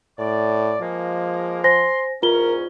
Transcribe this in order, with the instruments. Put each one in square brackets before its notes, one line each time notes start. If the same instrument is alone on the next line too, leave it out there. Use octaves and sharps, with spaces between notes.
[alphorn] A2 [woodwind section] D5
[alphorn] F3 [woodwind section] G#3 A#3
[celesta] C5 G#5 A#6 [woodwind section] C6
[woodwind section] E2 G#2 C#4 [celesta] F4 G7 [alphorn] A#4